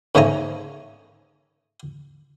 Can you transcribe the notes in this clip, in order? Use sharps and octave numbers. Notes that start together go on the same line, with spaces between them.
G#2 C#3 A3 D#4 G#5 A#5